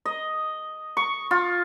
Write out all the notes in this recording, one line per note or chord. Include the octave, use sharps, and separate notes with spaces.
D#5
C#6
F4